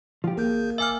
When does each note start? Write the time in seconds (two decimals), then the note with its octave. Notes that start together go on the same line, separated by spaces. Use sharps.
0.24 F3 G4
0.37 G#1 A#3 G#4 G6
0.78 G1 E5 G#5 D6 E6 F6